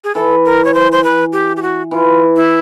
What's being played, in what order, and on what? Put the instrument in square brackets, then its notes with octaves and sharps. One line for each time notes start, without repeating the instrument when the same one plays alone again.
[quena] G#4
[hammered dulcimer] E3 [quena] A4
[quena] A#4
C#5
C5
C5
B4
G4
G4
F#4
[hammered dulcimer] E3 [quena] F4
[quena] E4